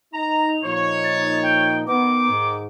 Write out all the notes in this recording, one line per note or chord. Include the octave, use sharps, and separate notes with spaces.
D#4 A#5 F7
A#2 F3 D#4 C#5
A6
G5
D#3 B3 D#4 D6
G#2